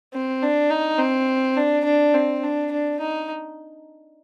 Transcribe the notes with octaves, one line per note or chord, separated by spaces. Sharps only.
C4
D4
D#4
C4
D4
D4
C4
D4
D4
D#4